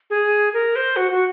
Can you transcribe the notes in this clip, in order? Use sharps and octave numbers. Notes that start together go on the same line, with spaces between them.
G#4
A#4
C5
F#4
F#4